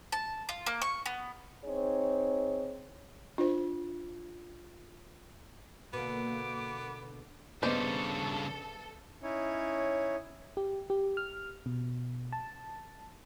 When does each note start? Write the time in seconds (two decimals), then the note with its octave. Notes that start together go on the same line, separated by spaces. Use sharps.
0.12 A5
0.49 F4
0.66 A#3
0.82 C#6
1.06 B3
1.65 C4 D#4 G#4 C#5
3.38 D4 F4 C5
5.93 B2 D3 A#3 B3 D6
7.63 G2 C#3 B3 A4 C5 D5 D#5
9.23 C#4 D#4 E4 C#5
10.57 G4
10.90 G4
11.17 F6
11.66 B2
12.33 A5